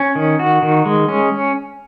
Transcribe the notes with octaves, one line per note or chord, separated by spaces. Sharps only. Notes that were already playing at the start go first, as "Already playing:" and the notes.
Already playing: C#4
D#3
F#4
D#3
G#3
C#4